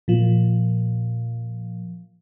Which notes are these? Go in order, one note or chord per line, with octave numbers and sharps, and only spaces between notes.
A#2 F3